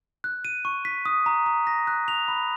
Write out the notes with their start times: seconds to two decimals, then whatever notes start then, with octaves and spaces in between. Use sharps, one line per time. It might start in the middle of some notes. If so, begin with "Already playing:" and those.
0.24 F#6
0.45 D#7
0.65 C#6
0.85 B6
1.06 D#6
1.26 A#5
1.46 A#5
1.67 A#6
1.87 F#6
2.08 F7
2.28 B5